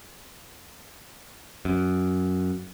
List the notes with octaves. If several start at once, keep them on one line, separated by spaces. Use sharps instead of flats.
F#2